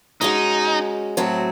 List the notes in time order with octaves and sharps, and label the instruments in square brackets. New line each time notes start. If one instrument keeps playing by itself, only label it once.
[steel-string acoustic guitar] G#3 C#4 F#4 [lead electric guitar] D#4
[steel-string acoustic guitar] A2 F#3 C4 F#4